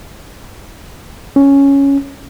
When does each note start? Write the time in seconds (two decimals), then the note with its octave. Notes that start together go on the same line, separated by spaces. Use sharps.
1.36 C#4